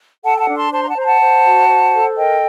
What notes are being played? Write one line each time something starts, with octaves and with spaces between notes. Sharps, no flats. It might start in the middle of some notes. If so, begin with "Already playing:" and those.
A4 F#5 A5
G5
F#5 A5
D4
A5 C6
C5 A5 C6
A#5
F#5 A5
C5 A#5
F#5 A5
C5
F#4
C5
A4
A#4 D#5 G5